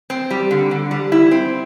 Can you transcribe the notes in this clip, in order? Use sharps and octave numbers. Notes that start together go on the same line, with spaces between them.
C4
G3
D3
D3
G3
E4
C4